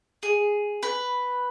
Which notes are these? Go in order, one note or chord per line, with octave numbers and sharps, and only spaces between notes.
G#4
B4